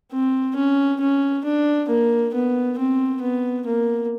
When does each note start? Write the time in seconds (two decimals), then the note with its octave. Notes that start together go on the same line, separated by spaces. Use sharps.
0.12 C4
0.56 C#4
1.01 C#4
1.45 D4
1.89 A#3
2.34 B3
2.78 C4
3.22 B3
3.66 A#3